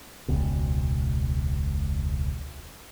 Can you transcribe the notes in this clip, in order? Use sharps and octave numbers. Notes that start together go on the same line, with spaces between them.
E1 C#2 B2